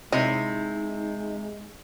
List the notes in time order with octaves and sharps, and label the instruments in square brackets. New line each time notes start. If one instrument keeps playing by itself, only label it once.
[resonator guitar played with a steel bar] C3 E4 [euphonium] G#3 [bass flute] D#4 [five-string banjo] D#5